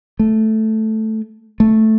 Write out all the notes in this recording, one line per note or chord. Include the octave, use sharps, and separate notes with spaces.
A3
A3